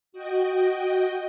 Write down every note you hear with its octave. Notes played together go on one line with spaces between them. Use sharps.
F#4 D#5 G5